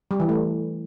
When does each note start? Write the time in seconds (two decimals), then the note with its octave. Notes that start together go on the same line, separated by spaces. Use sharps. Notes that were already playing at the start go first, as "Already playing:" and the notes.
0.11 G3
0.20 E3
0.29 A3